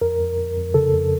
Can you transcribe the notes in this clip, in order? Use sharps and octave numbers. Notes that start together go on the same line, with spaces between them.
F2 A#4
F2
F2
F2
C#3 A4
F2